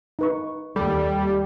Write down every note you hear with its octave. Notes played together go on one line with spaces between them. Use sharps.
D#4 B4 C#6
D#2 G3 A4